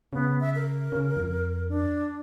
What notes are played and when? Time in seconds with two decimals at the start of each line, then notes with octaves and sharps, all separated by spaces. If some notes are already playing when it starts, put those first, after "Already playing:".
0.13 C#3 B3
0.40 E5
0.55 A#4
0.92 C#3
1.16 F2
1.69 D4